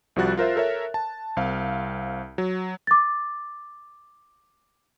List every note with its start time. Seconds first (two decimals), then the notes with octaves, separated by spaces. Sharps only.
0.16 C2 F3 G3 F#4 F#6 A6
0.37 F4 A#4 C5 E5
0.56 A4 A#4 C#5 E5
0.94 A5
1.37 C2 C4 F5
2.38 F#3
2.87 D6 A6